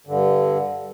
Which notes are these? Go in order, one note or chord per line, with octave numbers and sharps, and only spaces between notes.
G2 D3